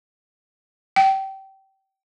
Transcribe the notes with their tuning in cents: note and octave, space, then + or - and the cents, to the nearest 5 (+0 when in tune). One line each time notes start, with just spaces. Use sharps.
G5 -25